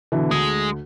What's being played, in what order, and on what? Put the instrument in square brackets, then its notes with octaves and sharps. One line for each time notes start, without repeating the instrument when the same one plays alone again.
[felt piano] B2 D3 E3
[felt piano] D2 [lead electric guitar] G#3